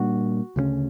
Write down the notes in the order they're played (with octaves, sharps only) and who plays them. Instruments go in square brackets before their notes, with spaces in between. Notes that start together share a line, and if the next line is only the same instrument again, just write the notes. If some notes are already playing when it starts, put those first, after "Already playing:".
Already playing: [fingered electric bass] A#2 G3 A#3 D4 [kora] F#4
[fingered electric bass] D2 C#3 G3 C#4